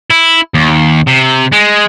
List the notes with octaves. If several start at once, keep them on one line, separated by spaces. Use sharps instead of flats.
E4
D#2
C3
G#3